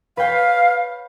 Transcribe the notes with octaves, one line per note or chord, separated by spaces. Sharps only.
B4 C#5 F5 G5